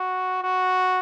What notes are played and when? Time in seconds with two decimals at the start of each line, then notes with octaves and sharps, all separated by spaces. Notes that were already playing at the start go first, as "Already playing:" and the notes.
Already playing: F#4
0.43 F#4